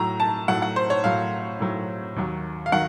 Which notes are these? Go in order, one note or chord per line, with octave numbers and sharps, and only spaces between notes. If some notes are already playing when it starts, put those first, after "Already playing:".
Already playing: A2 F#3 A#5
A5
A2 F#3 F#5
F#5
C5
C#5
A2 F#3 F5
A2 F#3
D#2 D#3 F#3
F5
D#3 F#3 F#5